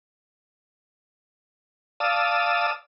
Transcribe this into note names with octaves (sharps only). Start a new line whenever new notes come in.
D5 F5 A5 D#6 E6